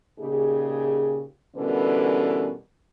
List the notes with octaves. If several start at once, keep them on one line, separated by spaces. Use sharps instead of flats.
A#2 C#3 D#4 G4 G#4
B2 D3 E3 G3 C#4 A#4